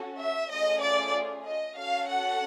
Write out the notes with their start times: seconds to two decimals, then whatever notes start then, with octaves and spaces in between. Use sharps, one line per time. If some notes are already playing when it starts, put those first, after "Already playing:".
Already playing: C#4 F#4 A4
0.20 E5
0.51 A3 C#4 F4 G#4 D#5
0.82 D5
1.45 D#5
1.76 C#4 F#4 A4 F5
2.07 F#5